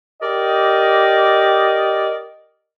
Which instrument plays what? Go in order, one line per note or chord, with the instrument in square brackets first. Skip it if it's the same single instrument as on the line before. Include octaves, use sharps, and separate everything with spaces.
[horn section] G4 A#4 D5 D#5